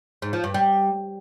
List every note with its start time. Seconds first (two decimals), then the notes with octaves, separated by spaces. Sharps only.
0.22 G#2
0.33 F3
0.44 G2
0.54 G3